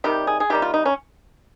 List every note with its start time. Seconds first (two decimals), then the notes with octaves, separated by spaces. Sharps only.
0.04 C3 D#3 G3 G4
0.27 G#4
0.40 G#4
0.50 C3 D#3 G3 G4
0.62 F4
0.74 D#4
0.85 C#4